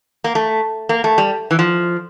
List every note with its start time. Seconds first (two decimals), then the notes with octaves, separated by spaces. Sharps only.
0.24 A#3
0.35 A3
0.89 A#3
1.04 A3
1.18 G3
1.51 E3
1.59 F3